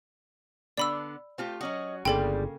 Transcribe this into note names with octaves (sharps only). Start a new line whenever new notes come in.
D3 B3 D4 D5 B5 E6
A3 C4 F4 G4
F#3 C#4 F#4 D#5
G1 C#3 G3 G#3 A#3 A4 G5